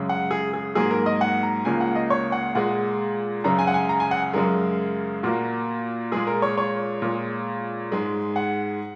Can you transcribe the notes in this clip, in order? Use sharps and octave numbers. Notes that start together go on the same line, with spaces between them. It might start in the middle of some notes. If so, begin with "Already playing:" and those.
Already playing: F#2 C#3 G#3
F#5
G#4
G#4
G#2 F#3 A#3 G#4
A#4
D#5
F#5
A#5
C#2 C#3 A#3 G#5
F#5
D#5
C#5
F#5
A#2 G#3 F#5
F#2 C#3 G#3 A#5
G#5
F#5
G#5
A#5
G#5
F#5
F#2 C#3 G#3 A#4
A#2 A#3 F#4
A#2 G#3 G#4
A#4
C#5
C#5
A#2 G#3
G#2 G#3
F#5